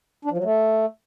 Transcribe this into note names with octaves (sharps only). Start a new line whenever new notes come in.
D4
F3
F#3
A3